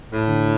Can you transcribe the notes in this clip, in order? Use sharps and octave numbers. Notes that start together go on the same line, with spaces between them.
A2
D3